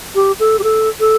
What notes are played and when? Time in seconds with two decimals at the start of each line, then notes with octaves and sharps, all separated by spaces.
0.15 G4
0.40 A4
0.59 G4
0.64 A4
1.00 A4